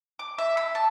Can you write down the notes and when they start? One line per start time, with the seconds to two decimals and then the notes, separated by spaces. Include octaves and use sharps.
0.19 D6
0.38 E5
0.57 B5
0.75 A5